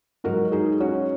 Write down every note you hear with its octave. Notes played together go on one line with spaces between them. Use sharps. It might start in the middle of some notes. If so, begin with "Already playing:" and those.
G#2 F#3 F#4 A#4
D#4 G#4
C#4 F#4